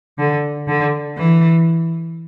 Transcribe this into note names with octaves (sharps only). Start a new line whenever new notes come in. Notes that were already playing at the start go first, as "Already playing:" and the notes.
D3
D3
E3